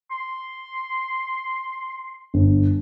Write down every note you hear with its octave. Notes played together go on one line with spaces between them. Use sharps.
C6
G1